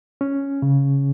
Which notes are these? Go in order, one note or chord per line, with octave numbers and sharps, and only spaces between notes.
C#4
C#3